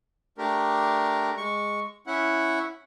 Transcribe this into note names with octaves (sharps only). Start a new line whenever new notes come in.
A3 D4 G4 A#4
G#3 C#6
C#4 E4 F#5